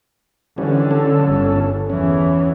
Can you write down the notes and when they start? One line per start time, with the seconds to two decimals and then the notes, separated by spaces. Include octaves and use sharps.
0.58 D3 E3 G3 C#4
0.91 C#4 A4
1.25 G1
1.90 E2 E3 C#4